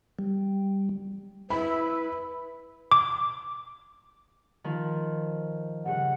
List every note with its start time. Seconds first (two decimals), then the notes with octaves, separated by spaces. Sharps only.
0.19 G3
1.50 E4 B4 B5
2.92 D6
4.64 D#3 F3
5.85 G2 C#3 F#5